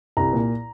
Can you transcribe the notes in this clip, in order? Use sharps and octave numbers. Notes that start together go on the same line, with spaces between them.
C2 A#5
A#2